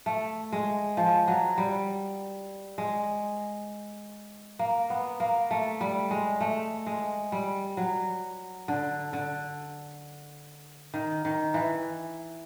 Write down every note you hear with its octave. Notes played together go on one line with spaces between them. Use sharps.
A3
G#3
F3
F#3
G3
G#3
A#3
B3
A#3
A3
G3
G#3
A3
G#3
G3
F#3
D3
D3
D#3
D#3
E3